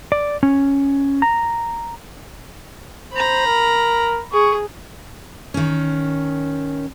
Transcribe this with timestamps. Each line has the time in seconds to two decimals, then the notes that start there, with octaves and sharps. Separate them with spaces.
0.12 D5
0.43 C#4
1.22 A#5
3.13 C5 A#5 B5
3.46 A#4
4.33 G#4 C#6
5.54 D#3 C#4